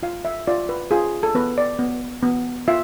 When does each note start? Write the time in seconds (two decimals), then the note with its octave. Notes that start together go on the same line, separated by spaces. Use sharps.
0.03 F4 F5
0.25 E5
0.47 F4 D5
0.69 B4
0.91 F4 G#4
1.23 A4
1.35 B3 B4
1.58 D5
1.79 B3
2.23 B3
2.68 F4 E5